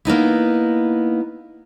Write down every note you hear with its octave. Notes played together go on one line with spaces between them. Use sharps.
A#3 B3 D#4 E4